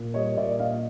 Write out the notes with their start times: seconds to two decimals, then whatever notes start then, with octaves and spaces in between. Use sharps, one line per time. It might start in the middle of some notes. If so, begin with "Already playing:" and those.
Already playing: A#2
0.14 G3 C#5 D#5
0.37 A#2 D5 E5
0.59 A#3 D#5 F5